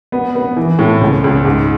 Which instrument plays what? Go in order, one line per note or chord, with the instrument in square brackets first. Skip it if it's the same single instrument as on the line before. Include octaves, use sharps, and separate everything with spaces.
[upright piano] B3
B3
E3
A2
C#2
C#2
G#2